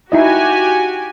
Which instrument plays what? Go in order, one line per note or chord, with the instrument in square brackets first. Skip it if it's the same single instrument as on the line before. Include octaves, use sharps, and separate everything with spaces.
[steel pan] D#4 E4 D#5 [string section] F#4 G4 G#5